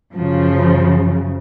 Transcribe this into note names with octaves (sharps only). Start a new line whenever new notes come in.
F#2 C#3 F3